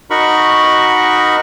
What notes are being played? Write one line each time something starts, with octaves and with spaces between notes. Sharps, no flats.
D#4 F#4 A#4 B5 C#6